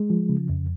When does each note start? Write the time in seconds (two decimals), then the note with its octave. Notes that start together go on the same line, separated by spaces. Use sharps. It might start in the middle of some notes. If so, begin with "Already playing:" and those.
Already playing: G#3
0.10 F3
0.29 C#3
0.50 F2